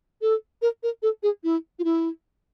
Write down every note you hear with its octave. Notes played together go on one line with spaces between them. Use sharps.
A4
A#4
A#4
A4
G#4
E4
F4
E4